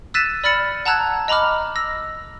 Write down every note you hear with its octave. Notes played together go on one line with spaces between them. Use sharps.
E6 F#6 A6 B6 D#7 E7
D5 B5 F6 A6 C#7 F#7
F#5 A5 A#5 E6 F#6 G#6
D#5 A#5 B5 D6 F6
E6 A#6